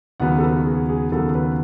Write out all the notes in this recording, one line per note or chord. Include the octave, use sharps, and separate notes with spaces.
D#2 C#3 F#3 B3 F#5
A4
B4
F#4
G#4
G#4
D#2 C#3 F#3 B3 A4
B4